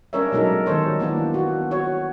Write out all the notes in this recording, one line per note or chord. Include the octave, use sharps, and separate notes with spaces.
G3 C#4 D4 A#4 C#5 E5
B2 F#3 G#3 D#4 A4 A#4
D#3 G3 A4 C5 C#5
E3 A#3 B3 D4
B3 F#4
F#4 C#5